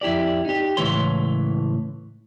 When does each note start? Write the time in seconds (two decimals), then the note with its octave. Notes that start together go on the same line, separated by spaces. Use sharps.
0.01 F2 E4 G4 D5
0.45 D#4 G4
0.77 C#2 A2 E3 C#5 C6